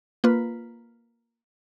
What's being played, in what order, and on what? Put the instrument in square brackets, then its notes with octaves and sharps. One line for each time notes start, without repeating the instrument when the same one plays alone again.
[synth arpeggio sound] A#3 F4 B4